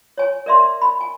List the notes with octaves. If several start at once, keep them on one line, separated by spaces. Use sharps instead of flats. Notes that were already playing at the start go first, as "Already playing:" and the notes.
C#5 G#5
A#4 D5 E5 C6
B5
G#5